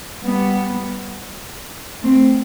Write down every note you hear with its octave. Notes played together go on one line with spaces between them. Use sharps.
G3 B3
A3 C4